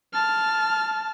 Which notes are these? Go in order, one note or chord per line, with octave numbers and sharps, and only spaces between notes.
A5 F6